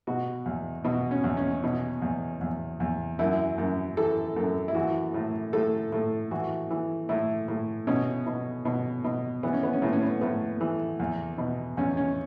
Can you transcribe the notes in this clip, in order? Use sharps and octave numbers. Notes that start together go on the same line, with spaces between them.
B2 F#4
E2
B2 F#4
C#4
E2
C#4
B2
E2
E2
E2
F#2 E4
F#2
E3 A4
F#2
E4
E3 F#4
A2
A2 A4
A2
E3 F#4
E3
A2 E4
A2
B2 C#4
B2
B2
B2
E3 B3
C#4
B3
C#4
A2 B3
C#4
B3
A2 B3
E3
E2
B2
E2 C#4
C#4